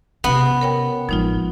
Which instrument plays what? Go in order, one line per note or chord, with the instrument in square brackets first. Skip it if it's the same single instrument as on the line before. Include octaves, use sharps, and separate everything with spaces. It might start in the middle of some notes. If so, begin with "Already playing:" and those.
[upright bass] C3 C#4 [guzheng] B3
[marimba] A#4 C#5 G5
[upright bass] A1 G#3 [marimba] F3 D#4 F4